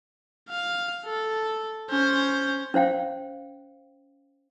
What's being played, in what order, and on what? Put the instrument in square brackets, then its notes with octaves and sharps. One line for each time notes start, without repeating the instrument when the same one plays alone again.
[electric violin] F5
A4
C#4 C5
[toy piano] C#4 C5 F5 G5